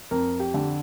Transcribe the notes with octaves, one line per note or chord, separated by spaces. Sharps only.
F2 A#4
G4
D3